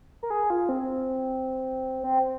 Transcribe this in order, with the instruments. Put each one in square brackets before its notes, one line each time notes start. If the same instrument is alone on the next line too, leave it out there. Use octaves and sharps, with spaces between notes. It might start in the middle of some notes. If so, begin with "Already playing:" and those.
[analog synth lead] A#4
G#4
F4
C4
C4